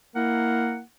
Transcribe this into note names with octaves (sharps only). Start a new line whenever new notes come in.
A#3 E4 A#4 F#5